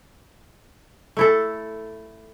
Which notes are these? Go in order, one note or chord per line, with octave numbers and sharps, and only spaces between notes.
A3 E4 A4